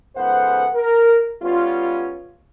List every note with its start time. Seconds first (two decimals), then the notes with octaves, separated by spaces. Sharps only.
0.16 C#2 G#2 B3 A4 C5 F#5
0.74 A#4
1.43 G3 B3 C#4 F4